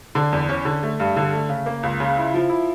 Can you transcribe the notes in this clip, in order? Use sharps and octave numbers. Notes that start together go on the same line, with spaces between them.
D3
E2
C#4
D3
A3
G2
D3
A3
C#3
A#3
C#2
C#3
E4
F3
E4